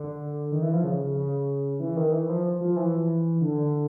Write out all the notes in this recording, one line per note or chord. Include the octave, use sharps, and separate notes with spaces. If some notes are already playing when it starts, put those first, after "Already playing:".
Already playing: D3
D#3
E3
F3
C#3
C#3
E3
D#3
E3
F3
F3
E3
D3